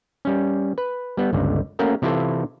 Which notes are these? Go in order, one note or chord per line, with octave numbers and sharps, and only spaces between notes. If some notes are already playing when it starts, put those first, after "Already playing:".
G3 C#4
B4
G3 B3
G1 C#2 D3
A3 A#3 C#4 F#4 A#4
C3 E3 E4 F4 A4